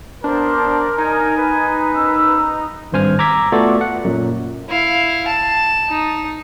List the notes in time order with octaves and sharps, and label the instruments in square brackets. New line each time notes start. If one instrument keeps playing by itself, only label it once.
[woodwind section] B3 C5 [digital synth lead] D4 [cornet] A#4
[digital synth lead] D#4 [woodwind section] G#5
[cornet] B4
[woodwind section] D#2 C#4 E6
[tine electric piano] G#1 G2 C5 G#5 F6
A#5 D6 E6 G#6 B6
A3 B3 F4 F#4 A4 D5
F#5
F#2 A#2 F#3
[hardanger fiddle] E4 F5
A5
D#4